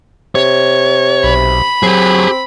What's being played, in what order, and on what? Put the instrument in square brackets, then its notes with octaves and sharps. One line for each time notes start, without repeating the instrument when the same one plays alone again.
[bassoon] C3 [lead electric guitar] C#5
[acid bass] B1 [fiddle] B5
[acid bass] F#3 [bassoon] C4 [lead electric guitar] G4 G#4